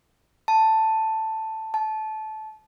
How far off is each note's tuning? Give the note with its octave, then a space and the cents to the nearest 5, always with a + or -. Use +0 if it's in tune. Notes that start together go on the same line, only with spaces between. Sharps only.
A5 +5
A5 -20